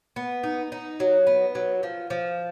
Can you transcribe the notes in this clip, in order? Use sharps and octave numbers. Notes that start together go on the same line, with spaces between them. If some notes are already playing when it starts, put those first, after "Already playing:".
B3
D#4
D#4
F#3
B3
F#3
F3
F3